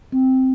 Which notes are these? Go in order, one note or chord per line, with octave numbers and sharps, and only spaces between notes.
C4